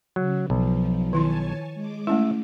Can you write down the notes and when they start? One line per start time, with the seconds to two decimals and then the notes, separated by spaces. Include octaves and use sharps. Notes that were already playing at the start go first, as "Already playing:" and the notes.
0.16 C#3 F#3
0.50 B1 F3
1.13 D#3 E4 C#5 G#5 A5 C6
1.74 G#3 D6
2.07 A3 C#4 E4 E5